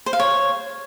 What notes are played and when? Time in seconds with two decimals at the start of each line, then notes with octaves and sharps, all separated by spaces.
0.06 C5
0.13 F5
0.20 C#5